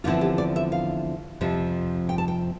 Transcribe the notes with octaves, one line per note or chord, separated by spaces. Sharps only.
E2 D3 F3 C4 E4 F4
G4
D5
E5
F5
F2 C3 F3
G5
A5
G5